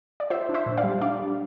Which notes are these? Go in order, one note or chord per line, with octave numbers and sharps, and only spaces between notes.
D5
F4 C5 E5
D4
C5 E5
A#2
D5 F5
G3
D4 D5 F5
G3